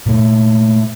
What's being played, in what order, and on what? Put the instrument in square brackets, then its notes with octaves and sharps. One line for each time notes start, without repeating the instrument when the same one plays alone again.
[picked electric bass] A#2 A3